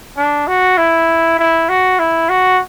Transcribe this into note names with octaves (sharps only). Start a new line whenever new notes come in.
D4
F#4
E4
E4
F#4
E4
F#4